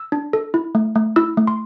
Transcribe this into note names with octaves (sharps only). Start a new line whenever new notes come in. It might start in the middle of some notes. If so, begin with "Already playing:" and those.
Already playing: E6
D4
A4
E4
A3
A3
E4 E6
A3
C6